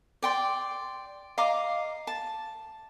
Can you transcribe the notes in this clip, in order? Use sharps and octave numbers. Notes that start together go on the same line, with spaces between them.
D5 G5 C6
D#5 F5 A#5 D6
A5